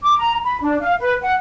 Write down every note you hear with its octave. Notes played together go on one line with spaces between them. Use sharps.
D6
A#5
B5
D4
F5
B4
F#5